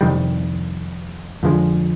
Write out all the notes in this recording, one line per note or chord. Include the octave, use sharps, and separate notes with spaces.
F2 C3 D#3 G3
F2 D3 F3 G#3